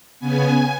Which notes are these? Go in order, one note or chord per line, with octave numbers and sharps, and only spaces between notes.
C#3 B3 G#5